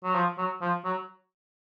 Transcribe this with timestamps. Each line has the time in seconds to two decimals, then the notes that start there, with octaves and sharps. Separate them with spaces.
0.04 F#3
0.15 F3
0.38 F#3
0.61 F3
0.85 F#3